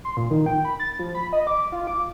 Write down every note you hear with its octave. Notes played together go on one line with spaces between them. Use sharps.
C6
A#2
D#3
G5
B5
A6
F3
B5
D#5
D6
F4
D6